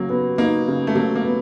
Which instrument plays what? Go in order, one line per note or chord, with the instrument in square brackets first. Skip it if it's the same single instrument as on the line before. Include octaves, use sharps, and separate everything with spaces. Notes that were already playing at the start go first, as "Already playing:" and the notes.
Already playing: [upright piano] C#3 F#3 [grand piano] A#3
[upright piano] B3
[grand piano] A#3 [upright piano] D#4
[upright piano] C#3
[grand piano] A3
[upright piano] F#3 [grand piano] A#3
[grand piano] A#3
[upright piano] B3